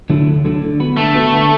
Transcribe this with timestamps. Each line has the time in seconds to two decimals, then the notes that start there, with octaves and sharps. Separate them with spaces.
0.10 D3 F#3 A3 E4
0.27 D2
0.45 D3 F#3 A3 E4
0.62 D3
0.80 B3 F#4 B4
0.97 D3 A3
1.15 B3 F#4 B4
1.32 D3